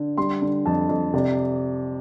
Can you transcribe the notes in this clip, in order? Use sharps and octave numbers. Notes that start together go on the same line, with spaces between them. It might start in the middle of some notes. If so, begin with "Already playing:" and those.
Already playing: D3
G3 C6
D3
F2 A5
F2
C3 D5